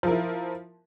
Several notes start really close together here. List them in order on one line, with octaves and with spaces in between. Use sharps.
F3 A#4 E4